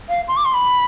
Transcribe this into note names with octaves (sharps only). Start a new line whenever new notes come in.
F5
C6
D6
C6
B5